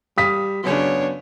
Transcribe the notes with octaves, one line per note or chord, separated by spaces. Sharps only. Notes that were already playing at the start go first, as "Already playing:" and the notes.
G3 F5 D#6 B6
F#2 C#3 B3 D4 C#5